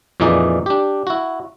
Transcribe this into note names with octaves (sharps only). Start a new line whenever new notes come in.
F2 A#2 E3 D#4 G#4 D5
D4 G4
E4 F#4